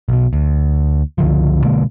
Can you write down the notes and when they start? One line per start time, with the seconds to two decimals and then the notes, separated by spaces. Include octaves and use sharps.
0.09 B1 B2
0.33 D2
1.18 C#2 D3 F3
1.64 B2 D3 G#3 A#3